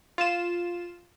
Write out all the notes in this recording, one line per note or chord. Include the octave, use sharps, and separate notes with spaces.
F4 E7